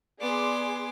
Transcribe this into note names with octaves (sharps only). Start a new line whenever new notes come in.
B3 G#4 D5 C6 D6